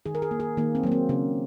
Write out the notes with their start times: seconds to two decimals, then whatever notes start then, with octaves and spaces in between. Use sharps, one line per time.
0.06 D#3 G#4
0.15 A#4
0.22 G#4
0.31 A#3
0.40 G#4
0.57 D#3 A#3
0.75 C4
0.83 F#3 A#3
0.92 C4
1.09 C#3